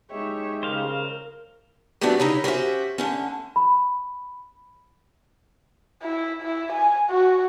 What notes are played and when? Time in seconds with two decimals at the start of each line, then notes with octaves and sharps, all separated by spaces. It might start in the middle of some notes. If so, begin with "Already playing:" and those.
0.11 G#3 D#4 G4 C#5 E5
0.63 C#3 A#4 C5 F5
2.01 G3 A3 B3 C4 D4 F#4
2.20 C#3 D#4 E4 C#5
2.44 C#4 F#4 G4 C5 E5
2.98 D3 A3 C#4
3.56 B5
6.02 E4
6.42 E4
6.72 G#5
7.09 F#4